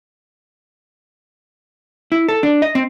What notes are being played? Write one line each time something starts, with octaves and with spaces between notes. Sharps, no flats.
E4
A4
D4
D#5
C4